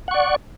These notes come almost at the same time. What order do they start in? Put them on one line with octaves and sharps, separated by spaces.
F#5 C#6 D5